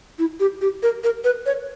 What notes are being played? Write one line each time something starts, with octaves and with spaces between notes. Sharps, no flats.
E4
G4
G4
A#4
A#4
B4
C#5